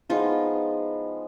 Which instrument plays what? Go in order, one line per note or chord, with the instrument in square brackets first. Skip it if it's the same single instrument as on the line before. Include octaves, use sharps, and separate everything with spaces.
[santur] F3 G#3 B3 [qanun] D#4 F4